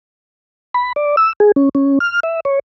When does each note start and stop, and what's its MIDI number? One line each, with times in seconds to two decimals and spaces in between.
0.74 0.93 83
0.96 1.16 74
1.17 1.33 88
1.40 1.52 68
1.56 1.69 61
1.75 1.99 61
2.00 2.20 89
2.23 2.40 76
2.45 2.59 73